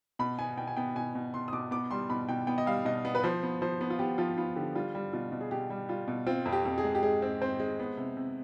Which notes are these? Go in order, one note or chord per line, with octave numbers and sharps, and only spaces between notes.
B2 B5
B3 G#5
B2 G5
G#5
B3 G5
B2 G#5
B2
B2 C6
D#6
B2 D6
B3 D6
G3 C6
B2 B5
B2 G5
B3 G5
D#5
G3 F5
B2 D#5
B3
B4
F3 C5
B3
F3 C5
B3
F4
B3 G4
F3 F4
B3 F4
D3 G4
G3 F4
G3
B2 F4
B2
G#4
B2 G4
G3
G3 F4
B2
C4 F4
F2
G4
F2
G#4
G#3
G4
G#3 G#4
C4
C4 C5
G#3
B3
C3
C3